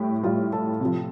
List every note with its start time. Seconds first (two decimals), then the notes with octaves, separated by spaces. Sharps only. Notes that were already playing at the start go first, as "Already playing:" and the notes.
Already playing: A2 G3 G4
0.23 A2 G3 F4
0.53 A4
0.80 C3 F3